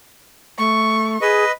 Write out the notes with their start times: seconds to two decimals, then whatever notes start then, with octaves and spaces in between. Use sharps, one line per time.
0.58 A3 C#6
1.21 G#4 B4 D#5